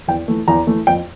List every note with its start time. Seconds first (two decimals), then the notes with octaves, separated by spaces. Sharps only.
0.08 E2 G5
0.28 E3 A3
0.48 E2 A#5
0.67 E3 A3
0.87 F2 G5